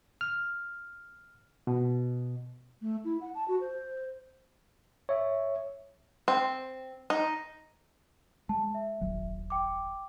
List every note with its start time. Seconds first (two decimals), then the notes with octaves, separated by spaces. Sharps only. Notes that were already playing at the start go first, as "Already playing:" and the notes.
0.21 F6
1.67 B2
2.82 A3
3.04 E4
3.21 F#5
3.35 A5
3.48 F#4
3.61 C5
5.09 C#5 E5
6.28 C4
7.10 D#4
8.49 G#3 A5
8.74 E5
9.01 D#1 G#1 F#3
9.50 G5 D6